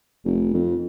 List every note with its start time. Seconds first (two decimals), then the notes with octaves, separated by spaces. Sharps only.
0.25 F1
0.54 F2